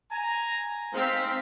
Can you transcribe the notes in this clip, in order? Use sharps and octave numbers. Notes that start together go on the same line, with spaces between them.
G#5 A#5
G#3 C4 D#4 F5 B6